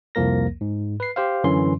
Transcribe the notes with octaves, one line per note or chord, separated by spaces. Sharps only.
C2 F2 F3 A#3 A#4 A#6
G#2
B4 C7
G4 C5 F5
F#2 D3 E3 C#4 C6